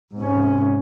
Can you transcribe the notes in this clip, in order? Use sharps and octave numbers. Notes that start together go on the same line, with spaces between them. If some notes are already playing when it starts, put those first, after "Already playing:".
G#2 C3 C#4